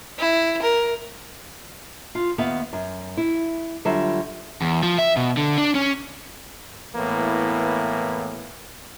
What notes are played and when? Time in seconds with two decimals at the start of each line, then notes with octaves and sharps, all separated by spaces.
0.19 E4
0.62 A#4
2.15 F4
2.38 D#2 B3 E5 F5
2.73 F#2
3.17 E4
3.85 D3 F#3 G3 F4 E5
4.61 E2
4.83 F3
4.98 E5
5.17 B2
5.37 D3
5.58 D4
5.75 C#4
6.96 A2 E3 A#3 B3